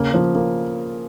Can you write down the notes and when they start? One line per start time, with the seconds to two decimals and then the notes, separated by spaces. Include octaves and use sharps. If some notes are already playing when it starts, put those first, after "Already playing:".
Already playing: C#3 A#3
0.14 F3
0.35 A#3